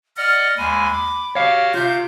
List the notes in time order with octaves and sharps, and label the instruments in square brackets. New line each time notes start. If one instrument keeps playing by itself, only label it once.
[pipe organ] D5 D#5 F#5 [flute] F6
[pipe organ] D#2 G#3 G#5 [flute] B5
[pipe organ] D6
[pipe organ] F#4 G4 F6 [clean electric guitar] C#5 F5
[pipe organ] C3 [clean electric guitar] F4 [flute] G6